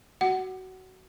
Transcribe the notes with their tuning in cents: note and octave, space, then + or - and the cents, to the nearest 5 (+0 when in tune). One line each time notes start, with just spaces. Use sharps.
F#4 +20 F#5 +15